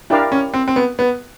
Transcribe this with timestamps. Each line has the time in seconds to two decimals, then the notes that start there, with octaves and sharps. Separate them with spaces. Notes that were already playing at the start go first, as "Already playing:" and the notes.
0.10 D4 E4 G4 A#4 D5 F5
0.32 C#4
0.54 C4
0.68 C4
0.76 B3
0.99 B3